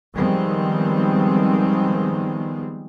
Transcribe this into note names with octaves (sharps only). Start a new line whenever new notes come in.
D#3 F3 G3 G#3 B3 C4